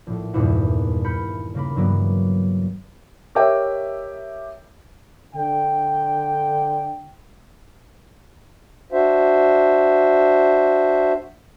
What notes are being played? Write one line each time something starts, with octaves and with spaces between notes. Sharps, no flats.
A#1 A2
D#1 E2 G2 A#2 E4 F#5
B5 F6 G6 C#7
C#3 A#3 B5
G2 E3 F#3 A#3 B3
G4 A#4 C#5 D#5 E5 G5
D3 G5
D4 F#4 C5 E5